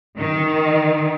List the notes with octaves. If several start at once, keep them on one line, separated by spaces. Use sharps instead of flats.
D#3